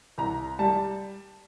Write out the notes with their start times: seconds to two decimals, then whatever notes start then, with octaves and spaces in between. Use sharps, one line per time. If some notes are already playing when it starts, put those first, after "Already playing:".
0.18 C2 A#5
0.59 G3 A5